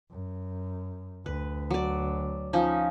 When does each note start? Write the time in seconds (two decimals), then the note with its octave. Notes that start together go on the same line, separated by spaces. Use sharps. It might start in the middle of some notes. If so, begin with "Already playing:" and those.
0.11 F#2
1.26 D2 B4
1.70 F#3 D5
2.53 F3 C#4 D#4